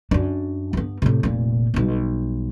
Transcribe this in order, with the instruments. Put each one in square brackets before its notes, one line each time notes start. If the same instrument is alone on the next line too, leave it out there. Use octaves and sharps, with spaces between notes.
[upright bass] F#2 D4
G2 B3
A2 C3
F1 A#2
B1 G3